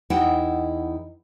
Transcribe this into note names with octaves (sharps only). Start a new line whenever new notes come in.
E2 D#4 E4 D#5 F#5 G5